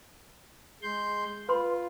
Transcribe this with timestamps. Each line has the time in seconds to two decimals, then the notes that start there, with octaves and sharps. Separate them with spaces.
0.83 G#3 C6 G6
1.49 F4 B4 B5 C6